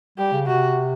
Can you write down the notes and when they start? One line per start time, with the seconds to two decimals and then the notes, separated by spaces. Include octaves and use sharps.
0.18 G3 G4
0.33 C#3
0.47 C3 F#4